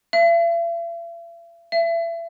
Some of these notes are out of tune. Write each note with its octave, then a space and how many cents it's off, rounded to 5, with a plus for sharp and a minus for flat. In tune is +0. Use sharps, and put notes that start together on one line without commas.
E5 +45
E5 +30